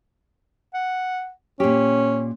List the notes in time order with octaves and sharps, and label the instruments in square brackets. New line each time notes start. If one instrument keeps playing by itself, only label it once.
[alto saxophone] F#5
[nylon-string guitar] A#2 G4 [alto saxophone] C#4